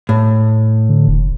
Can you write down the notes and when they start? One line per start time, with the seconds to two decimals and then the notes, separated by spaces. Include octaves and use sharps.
0.09 A2
0.89 D3
1.08 F1